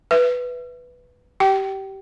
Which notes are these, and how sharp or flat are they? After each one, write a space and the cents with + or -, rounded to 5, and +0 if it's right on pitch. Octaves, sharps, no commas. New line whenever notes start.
B4 +0 E5 +0
G4 -20 G5 -25